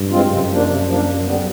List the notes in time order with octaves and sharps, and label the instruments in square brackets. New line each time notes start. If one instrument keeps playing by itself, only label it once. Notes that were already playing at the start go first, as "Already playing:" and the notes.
Already playing: [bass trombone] G2
[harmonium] E3 G#3 C4 F4
[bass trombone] F#2 [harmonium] C3
[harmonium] F3 A#3 D4
C3
F3 A#3 D4
D#2
D3 G3 B3